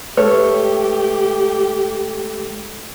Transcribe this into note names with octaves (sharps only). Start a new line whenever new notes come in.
G#3 A3 G4 A4 B4 C#5